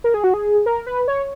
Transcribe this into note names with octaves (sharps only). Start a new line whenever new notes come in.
A#4
G#4
F#4
G#4
A#4
B4
C#5